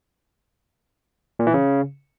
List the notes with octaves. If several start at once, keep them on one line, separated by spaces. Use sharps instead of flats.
A#2
E3
C#3